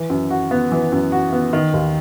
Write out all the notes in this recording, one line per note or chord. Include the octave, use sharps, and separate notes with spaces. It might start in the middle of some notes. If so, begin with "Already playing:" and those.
Already playing: E3
F#2
F#4
B3
E3
F#2
F#4
B3
D#3
D#2